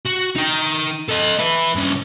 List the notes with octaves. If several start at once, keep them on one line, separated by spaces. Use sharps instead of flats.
F#4
D#4 G5
A4 D#5
E4 B4
G2 C#3